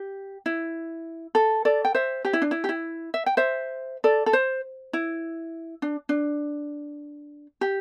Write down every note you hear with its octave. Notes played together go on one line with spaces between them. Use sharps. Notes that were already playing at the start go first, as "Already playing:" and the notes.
Already playing: G4
E4
A4
A4 D5
G5
C5 E5
G4
E4
D4
E4
G4
E4
E5
G5
C5 E5
A4 D5
A4
C5
E4
D4
D4
G4